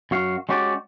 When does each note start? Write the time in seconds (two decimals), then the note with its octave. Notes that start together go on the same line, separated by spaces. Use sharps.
0.11 F#2 F#4 F5
0.49 G#3 C#4 F#4 G4 C5 D5